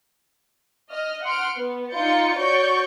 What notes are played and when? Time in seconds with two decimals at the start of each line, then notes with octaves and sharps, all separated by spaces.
0.91 D#5 F6
1.24 F#5 C6 F6 D7
1.57 B3
1.92 D#4 F4 D5 G6 A6 C#7
2.40 F#4 C#5 D5 C#6 G6 D7